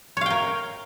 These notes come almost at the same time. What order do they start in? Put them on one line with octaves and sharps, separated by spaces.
C#5 F5 G5 A#4